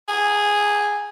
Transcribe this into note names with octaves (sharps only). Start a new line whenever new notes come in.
G#4